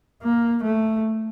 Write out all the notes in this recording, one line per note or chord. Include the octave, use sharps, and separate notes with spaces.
A#3
A3